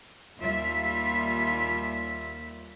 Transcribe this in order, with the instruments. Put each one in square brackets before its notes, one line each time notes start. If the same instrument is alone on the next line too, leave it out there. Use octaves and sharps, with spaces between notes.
[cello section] D#2 G3 F4 E5